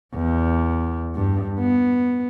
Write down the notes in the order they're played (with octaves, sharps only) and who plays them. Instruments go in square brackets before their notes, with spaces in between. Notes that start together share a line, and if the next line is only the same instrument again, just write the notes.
[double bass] E2
G2
B3